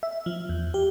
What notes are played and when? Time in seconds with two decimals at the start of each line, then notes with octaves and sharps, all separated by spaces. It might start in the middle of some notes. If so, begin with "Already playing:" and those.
0.03 E5
0.26 F3
0.49 E2
0.74 G4